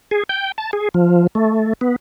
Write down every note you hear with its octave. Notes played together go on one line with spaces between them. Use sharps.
G#4
G5
A5
G#4
F3
A3
B3